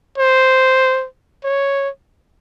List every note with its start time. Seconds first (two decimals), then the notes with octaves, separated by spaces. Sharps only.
0.18 C5
1.45 C#5